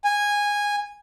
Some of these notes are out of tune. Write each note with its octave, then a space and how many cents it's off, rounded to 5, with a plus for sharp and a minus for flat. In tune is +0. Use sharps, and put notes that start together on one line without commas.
G#5 -15